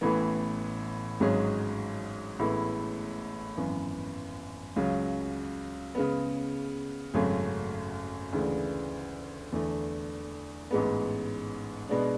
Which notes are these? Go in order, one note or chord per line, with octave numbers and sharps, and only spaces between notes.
A1 A2 E3 B3
G#1 G#2 F#3 C#4 G#4
A1 A2 G#3 B3 E4
G#1 F#2 E3 B3
C#2 C#3 F#3
C#3 G#3 B3
G#1 F#2 C#3 F#3 A3
D2 C#3 E3 G#3 D4
E2 D3 A3 E4
A1 G#2 G#3 B3
B2 G#3 B3 D4